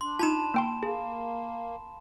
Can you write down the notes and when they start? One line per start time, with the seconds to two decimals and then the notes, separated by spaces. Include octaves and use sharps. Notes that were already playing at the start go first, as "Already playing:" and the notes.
0.01 D4 C6
0.19 D#4 F4 A5 B5 E7
0.54 A#3 G5 C6
0.83 A#3 G#4